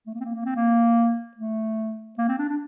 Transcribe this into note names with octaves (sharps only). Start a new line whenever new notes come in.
A3
A#3
C4
A#3
A#3
C4
A#3
A3
A#3
C4
D4
D4